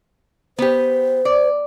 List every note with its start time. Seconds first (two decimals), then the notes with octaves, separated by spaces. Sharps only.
0.59 B3 G4 C5
1.25 D5